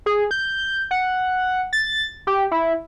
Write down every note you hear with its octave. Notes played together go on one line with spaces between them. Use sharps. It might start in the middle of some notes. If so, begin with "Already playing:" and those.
G#4
G6
F#5
A6
G4
E4